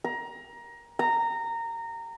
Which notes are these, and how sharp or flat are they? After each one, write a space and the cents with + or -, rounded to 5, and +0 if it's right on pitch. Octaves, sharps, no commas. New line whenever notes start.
A#5 +20
A#5 -20